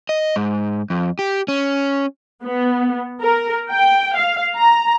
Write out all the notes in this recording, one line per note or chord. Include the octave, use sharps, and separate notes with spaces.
D#5
G#2
F2
G4
C#4
B3
A#4
G5
F5
A#5